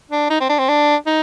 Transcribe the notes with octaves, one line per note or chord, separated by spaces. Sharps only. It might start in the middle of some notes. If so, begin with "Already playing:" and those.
D4
D#4
C4
D4
C4
D4
D#4